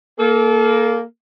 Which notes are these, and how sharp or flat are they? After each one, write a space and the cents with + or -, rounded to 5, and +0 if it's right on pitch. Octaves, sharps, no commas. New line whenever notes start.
A#3 +0 A4 -35